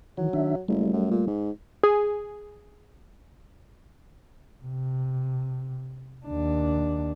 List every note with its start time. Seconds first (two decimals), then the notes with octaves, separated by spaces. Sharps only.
0.17 D#3 E3 F#3
0.33 D#3 D4 E5
0.68 F#1 G3 A3
0.93 F#2
1.11 A#2
1.27 G#2
1.83 G#4
4.65 C3
6.26 D#2 D4